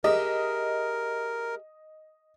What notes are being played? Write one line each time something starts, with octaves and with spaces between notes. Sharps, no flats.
G4 G#4 A#4 D#5 E5